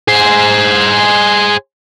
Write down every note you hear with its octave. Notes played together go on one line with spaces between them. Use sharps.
G#4 C5